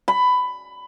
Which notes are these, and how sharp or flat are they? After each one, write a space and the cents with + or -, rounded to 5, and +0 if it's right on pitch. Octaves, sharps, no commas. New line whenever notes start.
B5 +15